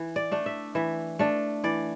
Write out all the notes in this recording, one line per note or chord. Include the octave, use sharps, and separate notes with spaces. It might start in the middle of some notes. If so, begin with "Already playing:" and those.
Already playing: E3
D5
A3 D4
E5
E3 E5
A3 D4
E3 D5